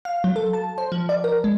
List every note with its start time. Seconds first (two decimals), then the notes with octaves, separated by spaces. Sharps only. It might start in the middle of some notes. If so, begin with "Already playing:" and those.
0.05 F5
0.24 F#3
0.36 A4
0.53 A5
0.78 C5
0.92 F3
1.09 D5
1.24 A#4
1.44 G#3